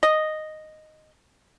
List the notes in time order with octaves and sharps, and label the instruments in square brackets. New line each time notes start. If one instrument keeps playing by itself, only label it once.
[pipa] D#5